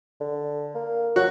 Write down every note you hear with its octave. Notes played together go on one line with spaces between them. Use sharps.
D3
A#3
F#3 F#4